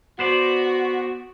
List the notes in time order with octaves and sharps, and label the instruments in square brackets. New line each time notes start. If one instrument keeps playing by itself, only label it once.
[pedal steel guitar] B3 C5 D5 [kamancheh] F#4